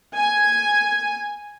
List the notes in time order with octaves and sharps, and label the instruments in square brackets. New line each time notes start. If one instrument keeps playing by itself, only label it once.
[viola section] G#5